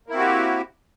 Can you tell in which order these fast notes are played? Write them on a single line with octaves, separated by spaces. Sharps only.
A#3 E4 C4 F#4 G4